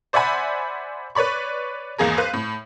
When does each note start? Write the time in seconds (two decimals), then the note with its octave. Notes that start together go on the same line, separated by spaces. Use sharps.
0.13 C5 D5 E5 F#5 G#5 B5
1.15 B4 C#5 D5 B5 C#6
1.98 G#1 E2 A#3 G#4 A#4
2.18 B4 C5 F5
2.34 A2